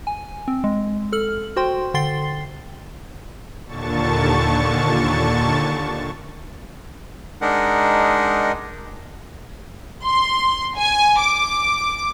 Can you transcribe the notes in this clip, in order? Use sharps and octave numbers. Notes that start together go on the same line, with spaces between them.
G#5
C4
G#3
A4 F6 F#7
F#4 C5 G5 C6
D3 G5 C6 A6 C7 G7
D#2 A#2 D3 A5 C#6 A6
G#3 D4 D#4 A#4 F#5
C6
G#5
D6